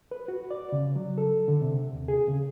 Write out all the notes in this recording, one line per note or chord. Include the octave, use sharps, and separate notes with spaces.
B4
F#4
D5
C#3
F#3
A4
D3
C3
D#2
G#4
C#3